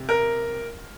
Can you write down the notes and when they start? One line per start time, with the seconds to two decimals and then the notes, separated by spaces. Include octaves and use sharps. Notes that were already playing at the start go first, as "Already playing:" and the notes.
Already playing: C3
0.09 A#4